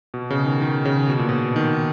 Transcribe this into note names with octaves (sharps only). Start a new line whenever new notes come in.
B2
C#3
D#3
D#3
C#3
B2
A#2
B2
D#3